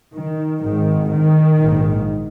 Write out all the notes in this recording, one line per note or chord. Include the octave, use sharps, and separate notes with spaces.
D#3
G#1 G#2 D#3
D#3
A#1 G#2